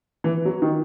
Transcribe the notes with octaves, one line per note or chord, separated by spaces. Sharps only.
E3
F#3
D#3